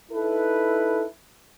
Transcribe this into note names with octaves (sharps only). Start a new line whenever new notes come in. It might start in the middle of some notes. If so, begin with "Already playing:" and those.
D#4 E4 A4 B4